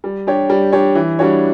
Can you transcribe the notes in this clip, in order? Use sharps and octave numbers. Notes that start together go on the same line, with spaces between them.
G3
D4 G4 C#5
G3
D4 G4 C#5
E3
G3 D4 F#4 C#5